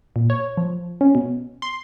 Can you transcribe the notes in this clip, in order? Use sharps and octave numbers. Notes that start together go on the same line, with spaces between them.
A#2
C#5
F3
C#4
B2
C6